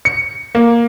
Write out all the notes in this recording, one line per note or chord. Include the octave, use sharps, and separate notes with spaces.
C#7
A#3